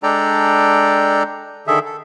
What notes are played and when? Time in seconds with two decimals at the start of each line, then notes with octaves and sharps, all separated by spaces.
0.03 G#3 D4 A4 D5 G5 A#5
1.67 D3 D#3 G#4 A4 E5
1.85 A4